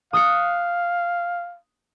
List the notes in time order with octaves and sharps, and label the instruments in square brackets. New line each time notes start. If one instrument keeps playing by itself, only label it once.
[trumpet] F5 [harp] D#6 F#6 C#7